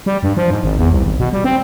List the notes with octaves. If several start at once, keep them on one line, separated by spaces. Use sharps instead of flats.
G3
G2
F3
G#2
G#1
E2
C2
G#1
B2
G3
C4